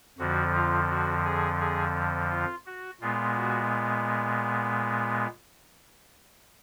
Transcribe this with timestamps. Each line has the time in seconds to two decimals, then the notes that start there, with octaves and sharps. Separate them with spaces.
0.19 F2 D3 F3 F#4
0.55 F4
0.89 F#4
1.25 G#4
1.60 G#4
2.31 F4
2.66 F#4
3.01 A#2 G#3 B3 F4
3.37 F#4